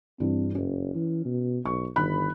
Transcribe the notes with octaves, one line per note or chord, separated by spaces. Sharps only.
G2 E3 C4
F#1 C#4
E3
B2
B1 C#6
G1 D#3 B5 F#6